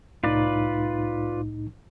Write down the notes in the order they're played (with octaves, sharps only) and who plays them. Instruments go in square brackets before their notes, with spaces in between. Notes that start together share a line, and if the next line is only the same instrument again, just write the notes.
[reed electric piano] C2 A2 D#4 [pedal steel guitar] F4 B4 D5